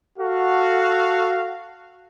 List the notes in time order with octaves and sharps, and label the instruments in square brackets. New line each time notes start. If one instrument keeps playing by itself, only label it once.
[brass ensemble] F#4 A4 F5